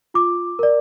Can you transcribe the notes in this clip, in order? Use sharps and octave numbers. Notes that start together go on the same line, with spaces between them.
F4 D6
A#4 D5